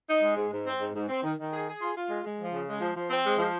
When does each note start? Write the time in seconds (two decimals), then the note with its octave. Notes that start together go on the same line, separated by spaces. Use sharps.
0.09 D#4
0.23 G#3
0.37 G#2
0.52 G#2
0.66 C4
0.80 G#2
0.95 G#2
1.09 C4
1.23 D#3
1.37 D#3
1.52 G#4
1.67 G#4
1.81 F4
1.96 F4
2.09 G#3
2.24 G#3
2.39 F3
2.53 C#3
2.67 G#3
2.81 F3
2.96 F3
3.10 C4
3.25 G#3
3.39 F3